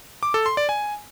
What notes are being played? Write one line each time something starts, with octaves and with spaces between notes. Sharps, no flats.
D6
A4
C6
D5
G#5